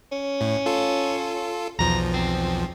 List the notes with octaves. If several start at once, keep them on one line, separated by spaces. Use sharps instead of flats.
C#4
A2
F4 A4
B1 E2 F3 A#5
C4